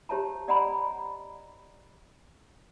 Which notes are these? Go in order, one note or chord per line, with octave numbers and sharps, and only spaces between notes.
G4 C5 C#5 E5 A5 A#5
D5 D#5 F#5 G#5 A#5 B5